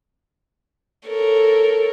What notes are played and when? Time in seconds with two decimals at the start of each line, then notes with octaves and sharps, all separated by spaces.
1.08 A4 A#4 C#5